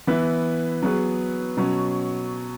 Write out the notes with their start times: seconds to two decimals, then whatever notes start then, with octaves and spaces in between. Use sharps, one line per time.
0.07 E3 B3 E4 B4
0.82 F#3 B3 G#4 B4
1.57 B2 F#3 C#4